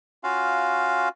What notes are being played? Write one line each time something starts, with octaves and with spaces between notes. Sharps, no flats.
C#4 F4 F#4 F5